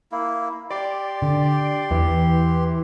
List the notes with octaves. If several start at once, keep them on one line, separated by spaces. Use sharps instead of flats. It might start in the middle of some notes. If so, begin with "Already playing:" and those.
A#3 E4
G4 D5 C6
D3
E2 E3